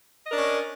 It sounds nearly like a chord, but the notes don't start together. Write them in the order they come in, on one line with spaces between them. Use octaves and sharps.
D#5 A#4 D4 C#4